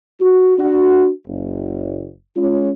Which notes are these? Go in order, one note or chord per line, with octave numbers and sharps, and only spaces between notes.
F#4
D4 F#4
F#1
G#3 C#4 F4